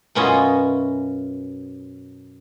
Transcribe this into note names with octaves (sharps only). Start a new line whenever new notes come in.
F#2 B2 C#4 E4 F4 D#5